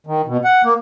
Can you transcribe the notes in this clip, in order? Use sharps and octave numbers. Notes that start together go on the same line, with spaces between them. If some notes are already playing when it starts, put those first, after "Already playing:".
D#3
B2
F#5
A#3